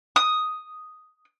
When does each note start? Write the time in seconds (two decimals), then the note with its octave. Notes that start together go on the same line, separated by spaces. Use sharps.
0.16 D#6